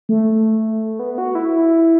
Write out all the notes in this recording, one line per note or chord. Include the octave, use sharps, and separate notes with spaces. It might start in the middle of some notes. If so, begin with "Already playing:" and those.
A3
B3
F#4
E4